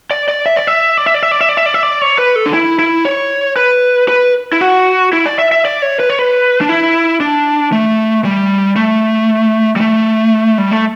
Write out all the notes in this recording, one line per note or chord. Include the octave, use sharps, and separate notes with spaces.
D5
D5
E5
D5
E5
D5
E5
D5
E5
D5
E5
D5
E5
D5
E5
D5
C#5
B4
A4
D4
E4
E4
C#5
B4
B4
E4
F#4
E4
D5
E5
E5
D5
C#5
B4
C#5
B4
D4
E4
D4
A3
G3
A3
G3
A3
G3
A3